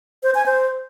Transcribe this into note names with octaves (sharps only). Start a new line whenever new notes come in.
C5
G#5
C5